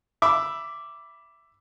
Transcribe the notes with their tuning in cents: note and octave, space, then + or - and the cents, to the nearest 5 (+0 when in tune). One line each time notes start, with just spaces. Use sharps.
E5 +10 B5 -10 D6 -5